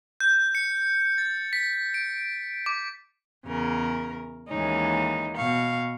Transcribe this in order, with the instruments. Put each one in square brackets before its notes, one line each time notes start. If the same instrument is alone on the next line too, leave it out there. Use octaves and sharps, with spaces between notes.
[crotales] G6
C#7
A6
B6
D7
D6
[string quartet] E2 C#3 A#4
D#2 E3 G#3 C#4 D#4
B2 F5 C#6